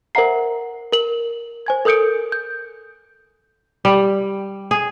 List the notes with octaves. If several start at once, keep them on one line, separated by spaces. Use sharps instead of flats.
A#4 C5 E5 F#5 A#5 C7
A#4 F#7
C5 G#5 G#6
A4 A#4 D#6 G6 C#7 D7
G6
G3
G#4